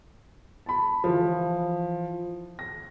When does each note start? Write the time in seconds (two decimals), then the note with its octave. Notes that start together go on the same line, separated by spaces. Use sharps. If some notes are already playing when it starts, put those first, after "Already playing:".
0.66 A5 B5
1.04 E3 F3
2.59 A#6